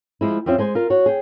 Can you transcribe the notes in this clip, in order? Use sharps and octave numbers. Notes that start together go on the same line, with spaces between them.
F3 G#3 E4
F2 C4 C#4 F4 E5
G#3 C5 G#5
F4 A#4
F#4 C#5
G#4 G5